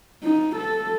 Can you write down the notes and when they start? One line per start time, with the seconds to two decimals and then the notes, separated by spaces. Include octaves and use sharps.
0.24 D#4
0.56 A4